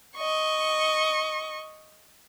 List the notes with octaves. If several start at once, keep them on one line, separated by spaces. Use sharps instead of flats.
D#5 C#6